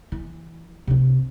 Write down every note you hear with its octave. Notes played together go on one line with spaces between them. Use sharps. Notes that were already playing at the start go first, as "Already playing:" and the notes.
E3
C3 D4